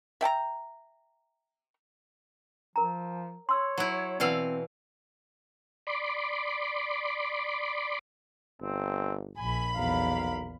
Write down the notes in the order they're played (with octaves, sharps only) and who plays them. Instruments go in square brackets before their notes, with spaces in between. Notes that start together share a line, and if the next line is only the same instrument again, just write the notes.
[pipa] E5 G5 A5 A#5
[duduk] F3 [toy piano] A#4 A#5
[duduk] C#5 [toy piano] C6 E6
[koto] F#3 E4
[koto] B2 E3 F5 [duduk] C4 [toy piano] D5 F#5 E6
[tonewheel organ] D5 B5 C6 D6
[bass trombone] G1 [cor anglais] C4
[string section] A#1 B5 [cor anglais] G#5
[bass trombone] B1 [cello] E2 F5 [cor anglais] A#4